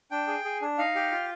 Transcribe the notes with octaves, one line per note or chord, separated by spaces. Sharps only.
D4 G5
G#4
G#4
D4
D#4 F5
G4
F4